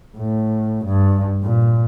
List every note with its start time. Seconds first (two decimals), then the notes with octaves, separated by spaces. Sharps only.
0.17 A2
0.85 G2
1.43 A#2